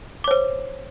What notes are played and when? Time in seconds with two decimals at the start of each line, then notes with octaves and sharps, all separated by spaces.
0.24 D6
0.28 C#5
0.31 C5